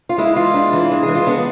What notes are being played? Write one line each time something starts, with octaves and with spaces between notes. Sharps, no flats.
F4
G#3 E4
E3 F4
D4
E3
G#3
G#4
E3
F4
B3 D4